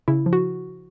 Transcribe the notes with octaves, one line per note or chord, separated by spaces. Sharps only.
C#3 E4
F3
F#4